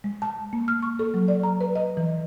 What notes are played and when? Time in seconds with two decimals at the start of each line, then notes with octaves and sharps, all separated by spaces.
0.04 G#3
0.22 A5
0.53 A#3
0.68 F6
0.83 C#6
0.99 A4
1.14 F#3
1.28 D5
1.43 A#5
1.61 B4
1.76 D#5
1.97 E3